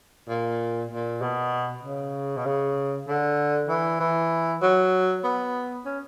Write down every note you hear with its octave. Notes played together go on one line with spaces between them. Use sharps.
A#2
A#2
B2
C#3
B2
C#3
D3
E3
E3
F#3
B3
C#4